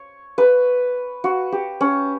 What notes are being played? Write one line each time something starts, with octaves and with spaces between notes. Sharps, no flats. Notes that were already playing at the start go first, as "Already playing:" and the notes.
Already playing: C#5
B4
F#4
G4
C#4